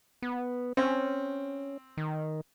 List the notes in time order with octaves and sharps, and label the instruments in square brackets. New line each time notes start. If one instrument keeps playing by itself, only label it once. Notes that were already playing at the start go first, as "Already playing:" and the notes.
[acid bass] B3
[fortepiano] C4 [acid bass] C#4
[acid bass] D#3